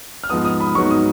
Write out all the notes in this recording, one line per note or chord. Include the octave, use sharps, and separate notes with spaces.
F6
G#2 F3 B3 D#4 D#6
D#6
B5
G#2 F#3 B3 D#4 C#6
D#6